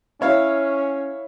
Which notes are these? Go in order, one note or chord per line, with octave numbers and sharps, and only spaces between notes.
C#4 E4 C#5 F5